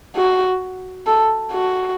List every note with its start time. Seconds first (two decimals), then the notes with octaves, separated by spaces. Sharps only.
0.16 F#4
1.07 A4
1.51 F#4